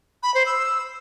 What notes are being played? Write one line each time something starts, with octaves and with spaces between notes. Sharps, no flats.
B5
C5
E6